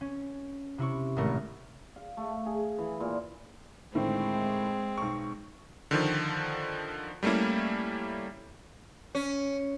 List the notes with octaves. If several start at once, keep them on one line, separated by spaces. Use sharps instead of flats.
C#4
C3 E4 C#6
G#1 A2 G#3 A3 A#4 C#6
F5
A3
G#4
E3
A#2
A2 D3 D#3 G#3 C4
B1 C#6
D3 D#3 F3
G3 A3 A#3 C#4 E4
C#4